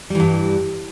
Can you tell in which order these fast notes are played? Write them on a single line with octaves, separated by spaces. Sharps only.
G3 E3 G2